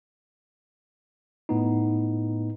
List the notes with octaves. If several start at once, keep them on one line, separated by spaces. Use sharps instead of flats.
A2 B3 D#4